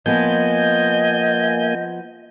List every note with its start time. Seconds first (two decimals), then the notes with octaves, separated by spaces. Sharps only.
0.06 F3 A#3 B3 D#5 G#5 G6